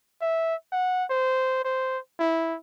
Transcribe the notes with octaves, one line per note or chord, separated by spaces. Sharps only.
E5
F#5
C5
C5
E4